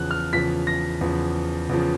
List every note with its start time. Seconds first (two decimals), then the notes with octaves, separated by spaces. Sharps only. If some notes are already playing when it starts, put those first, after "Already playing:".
Already playing: E2 C#3 F3 F#6
0.11 F6
0.33 E2 C#3 F3 B6
0.67 A#6
1.01 E2 C#3 F3
1.69 E2 C#3 F3